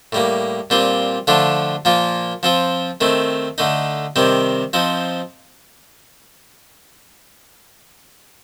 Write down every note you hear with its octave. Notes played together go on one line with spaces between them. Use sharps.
A2 G3 A#3
A#2 G3 C4 F4
D3 F3 A3 D4 F4
A#2 F3 A#3 F4
F3 C4 F4
D#3 A3 C4
D3 A3 D#4
C3 D#3 G3 C4
F3 C4 D#4